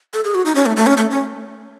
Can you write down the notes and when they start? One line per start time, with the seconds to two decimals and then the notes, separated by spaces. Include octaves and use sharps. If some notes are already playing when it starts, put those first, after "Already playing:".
0.14 A4
0.24 G#4
0.35 F#4
0.46 D#4
0.55 C#4
0.66 A3
0.77 A3
0.87 C#4
0.97 A3
1.11 C#4